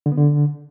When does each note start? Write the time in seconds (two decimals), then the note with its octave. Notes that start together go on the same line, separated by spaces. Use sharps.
0.06 D3
0.12 B3
0.18 D3